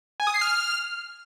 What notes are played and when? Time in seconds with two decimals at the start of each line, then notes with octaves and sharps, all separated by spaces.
0.20 G#5
0.27 D#6
0.34 C7
0.41 F6